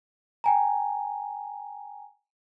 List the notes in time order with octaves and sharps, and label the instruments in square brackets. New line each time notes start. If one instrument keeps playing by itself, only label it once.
[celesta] G5 G#5 A#5